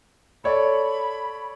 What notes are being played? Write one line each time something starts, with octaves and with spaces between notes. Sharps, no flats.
A4 C#5 D5 B5